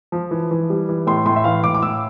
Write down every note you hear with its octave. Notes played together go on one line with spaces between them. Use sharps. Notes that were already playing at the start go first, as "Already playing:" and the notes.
F3
E3
E3
G3
E3
A2 C6
A2 C6
E5
E3 F5
A2 D6
D6
A2 E6